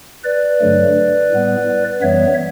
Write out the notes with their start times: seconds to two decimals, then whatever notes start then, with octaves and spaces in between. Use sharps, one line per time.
0.24 B4 D5
0.60 G2 D3 F#3 A3
1.31 A2 G3 B3
2.01 F#2 E3 G3 B3 C#5 E5